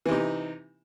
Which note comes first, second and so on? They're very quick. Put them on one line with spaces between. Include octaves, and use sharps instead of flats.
E3 C3 D#4